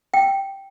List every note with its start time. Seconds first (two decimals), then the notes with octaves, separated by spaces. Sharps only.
0.14 G5